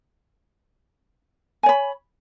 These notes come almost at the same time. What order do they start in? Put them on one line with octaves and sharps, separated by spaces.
G#5 C#5 B5